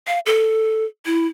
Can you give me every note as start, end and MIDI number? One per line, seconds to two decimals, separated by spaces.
0.07 0.19 77
0.26 0.85 69
1.06 1.26 64